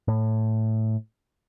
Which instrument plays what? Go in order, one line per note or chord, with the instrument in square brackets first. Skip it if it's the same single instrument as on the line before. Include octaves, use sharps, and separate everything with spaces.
[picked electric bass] A2